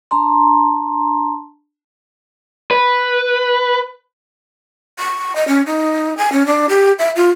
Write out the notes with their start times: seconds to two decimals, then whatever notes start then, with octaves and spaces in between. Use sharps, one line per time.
0.11 D4 A5 A#5 C6
2.71 B4
4.99 C#6
5.36 D#5
5.48 C#4
5.66 D#4
6.18 G#5
6.32 C#4
6.46 D4
6.69 G4
6.99 E5
7.16 F4